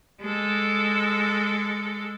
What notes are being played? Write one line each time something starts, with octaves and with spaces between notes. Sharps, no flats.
G#3 A4